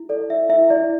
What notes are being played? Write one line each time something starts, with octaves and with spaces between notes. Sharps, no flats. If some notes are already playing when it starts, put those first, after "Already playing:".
Already playing: E4
A4 D5
E4 E5
E4 E5
E4 D5